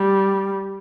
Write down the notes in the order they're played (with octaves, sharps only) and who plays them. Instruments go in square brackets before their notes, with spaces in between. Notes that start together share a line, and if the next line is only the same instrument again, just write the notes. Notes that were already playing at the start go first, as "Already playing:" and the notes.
Already playing: [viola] G3